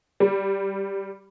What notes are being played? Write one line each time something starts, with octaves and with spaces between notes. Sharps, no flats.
G3